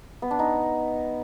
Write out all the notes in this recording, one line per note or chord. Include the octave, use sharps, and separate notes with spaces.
B3
D4
D#4